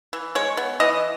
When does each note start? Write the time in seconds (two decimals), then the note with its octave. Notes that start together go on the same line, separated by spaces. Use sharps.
0.13 E3
0.35 G#3 C#5
0.57 B3
0.80 E3 D#5